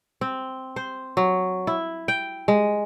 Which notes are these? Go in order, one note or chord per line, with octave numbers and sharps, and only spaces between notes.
C4
C5
F#3
E4
G5
G#3